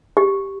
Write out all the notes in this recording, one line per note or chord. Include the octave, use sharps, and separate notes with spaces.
G4